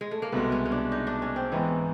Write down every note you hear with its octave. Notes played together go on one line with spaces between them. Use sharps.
G#3
A3
A#3
C2 B2 G#3 B3
C#4
C#4
D4
D#4
D4
C#4
C4
G#2 E3 G#3 B3 C#4 D#4